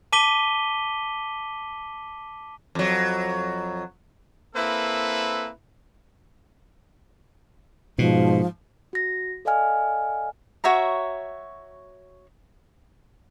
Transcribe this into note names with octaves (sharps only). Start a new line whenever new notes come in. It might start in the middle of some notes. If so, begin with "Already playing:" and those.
A5 D6 B6 D#7 G7
F2 F#3
A#3 C4 E4 A4 B4
G#2 B2 F3
F#4 A#6
A4 D5 D#5 F5 G#5 F6
F#4 C#5 E5 A#5